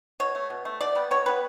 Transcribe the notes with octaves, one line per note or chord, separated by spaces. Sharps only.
B2 C#5
A3
B2
A3
B2 D5
G3 B3
B2 C#5
G3 B3 B4